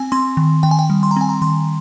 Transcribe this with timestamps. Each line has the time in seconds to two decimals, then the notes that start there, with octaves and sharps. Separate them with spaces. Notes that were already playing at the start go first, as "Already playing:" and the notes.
Already playing: C4 G#5
0.12 C4 C6
0.37 D#3
0.63 D#3 G5
0.71 G#5
0.79 G5
0.90 G3
1.03 C6
1.11 A#5
1.16 C4 G#5
1.29 A#5
1.42 D#3 C6